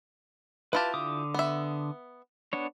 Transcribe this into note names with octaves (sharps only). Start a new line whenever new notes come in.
E4 F4 G4 B4 A5
D3 D6 D#6
B3 E5
B3 D4 C#5